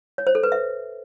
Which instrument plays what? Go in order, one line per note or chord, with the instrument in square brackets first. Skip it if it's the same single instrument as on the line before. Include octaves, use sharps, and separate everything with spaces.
[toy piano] C#5
C5
A4
B4
E5